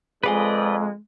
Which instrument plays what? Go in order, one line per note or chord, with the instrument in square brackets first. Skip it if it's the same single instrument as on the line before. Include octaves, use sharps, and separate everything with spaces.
[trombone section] F2 [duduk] G#3 [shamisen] G#4 F5 G#5 [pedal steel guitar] B4 D5 D#5